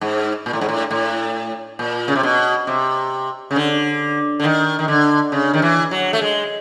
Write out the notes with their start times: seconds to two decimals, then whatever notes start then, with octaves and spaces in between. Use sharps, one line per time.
0.01 G#2
0.46 A#2
0.53 A2
0.61 G#2
0.69 A2
0.91 A2
1.79 A#2
2.08 C#3
2.15 C3
2.23 B2
2.67 C3
3.51 C#3
3.56 D3
4.40 D3
4.44 D#3
4.79 D#3
4.88 D3
5.32 C#3
5.54 D#3
5.62 E3
5.91 F#3
6.13 A3
6.22 G#3